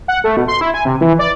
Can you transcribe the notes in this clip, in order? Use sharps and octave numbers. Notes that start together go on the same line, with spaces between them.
F#5
A3
B2
C6
E4
G#5
C3
E3
D5